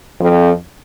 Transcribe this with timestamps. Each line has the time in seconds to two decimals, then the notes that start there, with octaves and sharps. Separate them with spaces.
0.20 F2